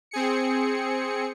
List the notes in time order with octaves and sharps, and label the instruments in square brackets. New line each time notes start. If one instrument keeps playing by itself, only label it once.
[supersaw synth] C4 G#4 C#7